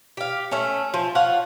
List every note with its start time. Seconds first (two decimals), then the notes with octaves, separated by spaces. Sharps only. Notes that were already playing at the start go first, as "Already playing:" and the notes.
0.17 G4 F5
0.51 A3 C#4
0.94 F3
1.15 F4 C#5 F#5